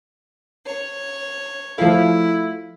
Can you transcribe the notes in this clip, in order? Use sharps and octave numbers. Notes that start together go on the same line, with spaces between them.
C#5
F3 A3 E4 F4 F5